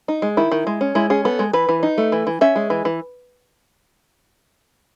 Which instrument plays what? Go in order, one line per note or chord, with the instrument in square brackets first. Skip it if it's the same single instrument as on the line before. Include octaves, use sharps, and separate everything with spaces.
[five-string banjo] D#4
G#3
D#3 E4
D#3
G#3
C#4
G#3 E4
C#4 G#4
B3 A4
G#3
E3 B4
E3
D#4
A3
E3
E3
C#4 E5
G#3
E3
E3